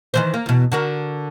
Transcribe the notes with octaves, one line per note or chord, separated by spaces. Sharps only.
D#3 E3 C5
A#3
E2 B2
D3 F#4 A#4